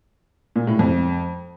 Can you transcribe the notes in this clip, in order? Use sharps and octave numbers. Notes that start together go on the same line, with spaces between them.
A#2
A2
F2